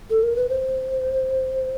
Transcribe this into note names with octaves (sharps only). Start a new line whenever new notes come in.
A4
A#4
B4
C5